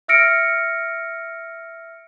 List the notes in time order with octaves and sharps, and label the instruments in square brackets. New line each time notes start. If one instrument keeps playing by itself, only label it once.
[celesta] E5 E6 F6 A#6 C#7 D7